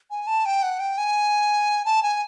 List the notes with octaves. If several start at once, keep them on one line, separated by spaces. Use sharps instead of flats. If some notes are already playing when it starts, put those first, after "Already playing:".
G#5
A5
G5
F#5
G5
G#5
A5
G#5